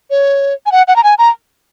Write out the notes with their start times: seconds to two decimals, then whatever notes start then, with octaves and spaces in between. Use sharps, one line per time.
0.10 C#5
0.66 G#5
0.72 F#5
0.88 F#5
0.96 A#5
1.04 G#5
1.18 A#5